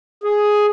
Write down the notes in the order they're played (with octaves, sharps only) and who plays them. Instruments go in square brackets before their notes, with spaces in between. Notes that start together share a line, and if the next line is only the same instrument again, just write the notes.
[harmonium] G#4